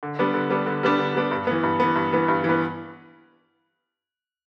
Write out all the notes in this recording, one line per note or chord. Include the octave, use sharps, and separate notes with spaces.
D3
G3 B3 D4
D3
G3 B3 D4
D3
G3 B3 D4
D3
G3 B3 D4
G2
E3 B3
G2
E3 B3
G2
E3 B3
G2
E3 B3